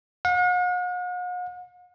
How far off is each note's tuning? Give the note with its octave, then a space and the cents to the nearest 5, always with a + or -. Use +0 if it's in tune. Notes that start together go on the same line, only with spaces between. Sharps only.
F#5 -45